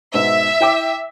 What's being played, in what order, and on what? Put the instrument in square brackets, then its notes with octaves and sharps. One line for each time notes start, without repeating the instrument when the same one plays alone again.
[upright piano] G#2 B2 [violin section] E5
[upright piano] E4 G5 D6